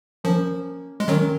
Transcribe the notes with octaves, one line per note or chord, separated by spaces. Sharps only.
F3 A#3 C#4
G#3
D#3 F#3 A#3 C#4